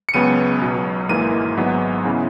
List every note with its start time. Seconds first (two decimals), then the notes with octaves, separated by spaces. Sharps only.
0.09 C#7
0.14 C#2 C#3 F#3 B3 D#7
0.62 B1 B2 F#3
1.09 G#1 G#2 E3 A#3 D#7
1.57 G#1 G#2 F#3 B3
2.05 C#3 E3 B3